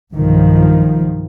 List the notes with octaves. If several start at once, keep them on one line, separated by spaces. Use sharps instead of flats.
B1 G2 D#3 F3